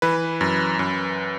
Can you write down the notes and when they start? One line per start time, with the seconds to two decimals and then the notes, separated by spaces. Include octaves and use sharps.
0.02 E3 B4
0.41 F#2
0.79 F#2